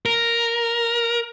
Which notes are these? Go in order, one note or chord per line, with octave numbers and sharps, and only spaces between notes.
A#4